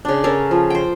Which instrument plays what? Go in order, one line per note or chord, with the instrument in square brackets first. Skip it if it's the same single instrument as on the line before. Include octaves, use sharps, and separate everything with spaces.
[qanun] C#3 D4
C#4 A4 A#4
F3
C5 G5